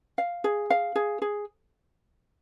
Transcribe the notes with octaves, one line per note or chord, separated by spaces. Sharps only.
F5
G#4
F5
G#4
G#4